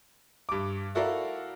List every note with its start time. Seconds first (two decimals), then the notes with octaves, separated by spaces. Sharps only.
0.49 G2 D6
0.95 E4 F#4 A4 A#4 D5 F5